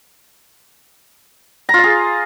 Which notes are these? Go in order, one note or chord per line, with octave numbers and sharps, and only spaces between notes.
F4 G#4 F5 A#5